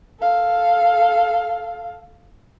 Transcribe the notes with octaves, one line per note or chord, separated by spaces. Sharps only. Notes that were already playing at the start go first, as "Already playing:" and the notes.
A4 F5